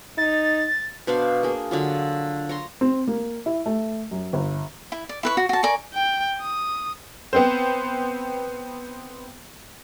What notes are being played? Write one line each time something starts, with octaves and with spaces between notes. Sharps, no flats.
D#4 A6
B2 D4 C5 F5
A#3 G#4
D3 F#3 F4
C#5 A#5 C6
C4
A#3
E4
A3
F#2
G1
E4
D5
E4 B4 C#6
F#4
F#4 A5
A#4 D5 G#5 C#6
G5
D#6
B3 C4 C5